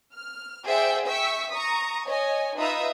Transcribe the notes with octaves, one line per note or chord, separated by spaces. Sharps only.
F6
G#4 C5 D5 E5 F#5 G5
E5 G5 C#6 E6 B6
A#5 C#6 D#6
C#5 D#5 G#5
D#4 F4 B4 E5 A#5 D#6